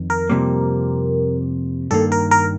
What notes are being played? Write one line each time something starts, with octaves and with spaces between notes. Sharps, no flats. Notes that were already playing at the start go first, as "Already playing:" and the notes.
Already playing: F2 D#3
A#4
F2 C3 G3 A#3
G2 D#3 A#3 A4
A#4
A#4